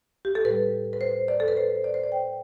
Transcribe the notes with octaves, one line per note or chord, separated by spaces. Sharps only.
G4
A4
A2 G3 B4
B4
C5
D5
A4
B4
C5
D5
C5
D5
G5